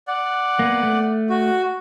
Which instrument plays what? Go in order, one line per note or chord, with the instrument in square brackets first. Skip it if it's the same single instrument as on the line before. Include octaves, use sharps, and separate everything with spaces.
[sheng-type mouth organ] D5 F#5
[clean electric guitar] A#3 B3
A3
[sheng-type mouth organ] F#4